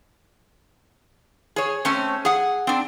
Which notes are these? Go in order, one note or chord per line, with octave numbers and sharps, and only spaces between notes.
G#4 C#5
A3 C4 C#4
G#4 F#5
C4 D4